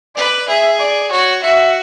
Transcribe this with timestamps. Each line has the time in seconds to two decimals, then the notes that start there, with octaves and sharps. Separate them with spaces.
0.16 B4 D5
0.48 G#4 E5
0.80 D5
1.11 F#4 C#5
1.42 F#4 E5